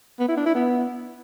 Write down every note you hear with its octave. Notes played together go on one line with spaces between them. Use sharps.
B3
E4
D4
E4
B3